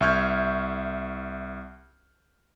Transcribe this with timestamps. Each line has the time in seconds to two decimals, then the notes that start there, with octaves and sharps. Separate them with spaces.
0.01 C2 E5 C#6 F6 G6 G#6